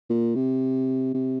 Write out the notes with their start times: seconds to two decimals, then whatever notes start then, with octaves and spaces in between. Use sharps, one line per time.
0.10 A#2
0.35 C3
1.14 C3